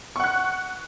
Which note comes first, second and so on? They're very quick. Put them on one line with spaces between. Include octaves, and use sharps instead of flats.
C#6 F#5 F#6